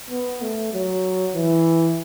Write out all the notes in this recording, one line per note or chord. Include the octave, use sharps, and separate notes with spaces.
B3
A3
F#3
E3